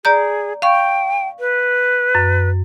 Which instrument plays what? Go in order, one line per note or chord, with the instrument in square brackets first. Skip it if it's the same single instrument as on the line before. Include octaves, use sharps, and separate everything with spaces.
[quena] G#4 [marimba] D5 A#5 G6
[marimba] F5 C#6 [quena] G5
[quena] B4
[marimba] F#2